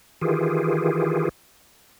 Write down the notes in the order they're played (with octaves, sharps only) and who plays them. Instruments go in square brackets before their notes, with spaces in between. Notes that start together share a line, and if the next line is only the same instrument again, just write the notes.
[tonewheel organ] D#3 E3 F4 G4 G#4